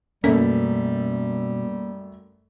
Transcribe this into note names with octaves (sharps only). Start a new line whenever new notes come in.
F#2 B2 G3 A3 A#3 C#4 B6